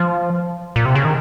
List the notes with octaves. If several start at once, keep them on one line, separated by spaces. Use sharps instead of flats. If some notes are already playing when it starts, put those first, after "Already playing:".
Already playing: F3
A#2
C3
C#3
D#3